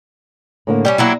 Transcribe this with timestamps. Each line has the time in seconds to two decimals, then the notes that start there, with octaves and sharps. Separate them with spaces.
0.67 A2 D3 A#3
0.85 G3 A#3 C#4 D5
0.98 F#3 A#3 E4